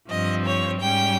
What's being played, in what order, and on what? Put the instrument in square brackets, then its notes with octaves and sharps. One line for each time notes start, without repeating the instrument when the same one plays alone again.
[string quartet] G2 F3 C4 D#5
C#5
G#2 G3 C#4 G5